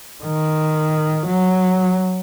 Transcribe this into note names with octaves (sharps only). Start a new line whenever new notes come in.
D#3
F#3